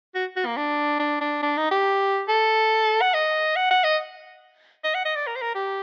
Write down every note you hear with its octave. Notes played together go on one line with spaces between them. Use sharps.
F#4
F#4
A#3
D4
D4
D4
D4
D#4
G4
A4
F#5
D#5
F#5
F#5
D#5
D#5
F#5
D#5
D5
A#4
C5
A#4
G4